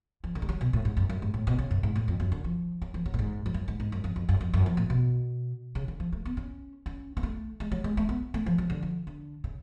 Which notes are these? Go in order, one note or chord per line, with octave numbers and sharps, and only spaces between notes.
F3
D3
G#3
F#3
B2
A2
G#2
F#2
F#2
G#2
A2
B2
C#3
F#2
G#2
A2
F2
F#2
D3
F3
F#3
F3
F#3
A2
G#2
F2
F#2
G#2
G#2
F#2
F2
F2
F#2
F2
F#2
F3
A2
B2
C#3
D3
F3
A3
B3
C#4
C#4
B3
A3
G#3
F#3
G#3
A3
B3
A3
F3
F3
D3
F3
D3
C#3